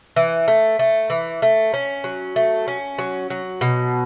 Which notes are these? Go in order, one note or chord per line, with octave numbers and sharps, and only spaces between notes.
E3
A3
A3
E3
A3
C#4
F#3
A3
C#4
F#3
F#3
B2